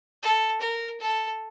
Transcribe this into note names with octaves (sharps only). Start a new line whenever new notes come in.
A4
A#4
A4